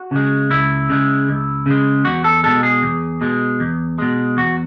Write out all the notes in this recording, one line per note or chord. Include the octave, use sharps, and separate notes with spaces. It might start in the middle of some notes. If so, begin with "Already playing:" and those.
Already playing: F#4
C#3 G#3
C#2 E4
C#3 G#3
C#2
C#3 G#3
E2 F#4
A4
B2 G#3 A4
G#4
E2
B2 G#3
E2
B2 G#3
E2 F#4